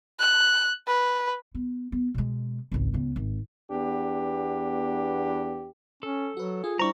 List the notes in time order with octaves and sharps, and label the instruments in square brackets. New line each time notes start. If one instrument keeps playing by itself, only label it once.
[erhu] F#6
B4
[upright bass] B3
B3
B2 G#3
G#1 C#2
C#2 B3
G#1
[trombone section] E2 B3 D4 G4
[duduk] C#4 [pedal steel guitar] A4
[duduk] F#3 [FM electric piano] F#4 B4
[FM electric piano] F4 [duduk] G#4
[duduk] G3 [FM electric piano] D4 E4 C5 [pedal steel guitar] A#5 C#6